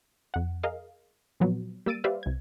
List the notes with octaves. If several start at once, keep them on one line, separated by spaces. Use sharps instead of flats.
F2 F#5
G#4 A#4 D#5 F5
A#2 F3 F#3 B3
G3 A#3 E6 A6 D7 D#7
G4 B4 C5 D5 E5 F5
C2 G#6